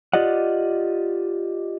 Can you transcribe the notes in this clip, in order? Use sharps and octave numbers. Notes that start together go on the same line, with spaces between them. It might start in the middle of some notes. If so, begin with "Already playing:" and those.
F4 G4 D5 D#5 F#5